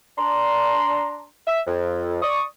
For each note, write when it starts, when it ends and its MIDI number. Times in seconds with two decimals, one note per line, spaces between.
0.18 1.25 62
0.18 1.25 82
0.18 1.25 84
1.47 1.60 76
1.67 2.20 41
2.22 2.43 74
2.22 2.43 85
2.22 2.43 87